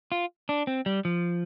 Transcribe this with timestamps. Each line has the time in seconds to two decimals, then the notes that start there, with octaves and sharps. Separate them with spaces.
0.12 F4
0.49 D4
0.67 C4
0.86 G3
1.05 F3